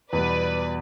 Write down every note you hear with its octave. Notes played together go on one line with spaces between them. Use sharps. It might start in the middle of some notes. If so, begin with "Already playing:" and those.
E2 B2 G3 B4 D5